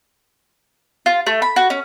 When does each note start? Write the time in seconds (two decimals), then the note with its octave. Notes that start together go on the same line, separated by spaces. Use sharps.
1.06 F4
1.26 A3
1.42 B5
1.56 F#4
1.70 C#4